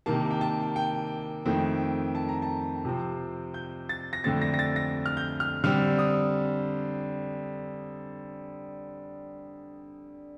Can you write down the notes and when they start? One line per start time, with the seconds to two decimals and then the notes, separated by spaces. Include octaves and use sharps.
0.06 C3 D#3 A#3 A5
0.31 G5
0.41 A5
0.76 G5
1.45 F2 D#3 A3 C4
2.15 A5
2.29 A#5
2.42 A5
2.85 C3 F3 C4
3.54 G6
3.89 A6
4.13 A#6
4.24 F2 D3 A3 C4 A6
4.42 A#6
4.54 A#6
4.59 A6
4.76 A#6
5.06 F6
5.17 G6
5.40 F6
5.64 D3 G3 C4 F6
5.98 D#6